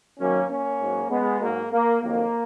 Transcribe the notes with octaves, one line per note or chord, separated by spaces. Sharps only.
F#2 D#3 F#3 A#3 C#4
A#3 C#4
G#2 F#3
G#3 B3
G#2 F#3 A#3
A#3
F2 D#3 F#3 A#3